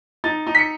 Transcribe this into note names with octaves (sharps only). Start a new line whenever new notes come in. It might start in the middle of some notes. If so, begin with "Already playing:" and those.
D#4 A6
D#4
B6
C#7